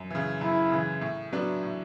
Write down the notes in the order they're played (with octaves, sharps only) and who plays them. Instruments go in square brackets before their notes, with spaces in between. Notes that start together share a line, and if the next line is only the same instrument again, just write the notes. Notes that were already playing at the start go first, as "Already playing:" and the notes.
Already playing: [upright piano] F#2
C#3 E3
[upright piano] F#2 [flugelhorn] E4
[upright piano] C#3 E3
A2
F#3 B3 D4
A2